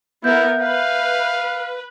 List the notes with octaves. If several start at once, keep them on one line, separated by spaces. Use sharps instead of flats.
B3 E4 A#4 E5 G6
B4 F5